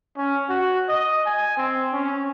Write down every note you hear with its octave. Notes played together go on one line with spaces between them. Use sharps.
C#4
F#4
D#5
G#5
C4
C#4